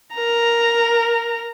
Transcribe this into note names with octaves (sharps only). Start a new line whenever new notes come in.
A#4 A#5